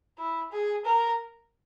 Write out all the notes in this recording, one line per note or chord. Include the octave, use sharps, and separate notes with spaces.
E4
G#4
A#4